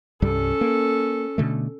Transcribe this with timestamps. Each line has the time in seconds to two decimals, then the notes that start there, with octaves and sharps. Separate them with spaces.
0.22 C2 G2 G3 C#4 A4
0.61 A#3
1.38 B2 D3 A3